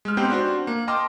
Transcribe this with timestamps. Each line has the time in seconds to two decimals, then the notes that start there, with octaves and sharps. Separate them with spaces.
0.05 G#3 F6
0.17 B3 C4 D#4 G4 C5 G5
0.30 D4 F#4 C5
0.67 A#3
0.88 D#5 G5 A5 C6 D6 F6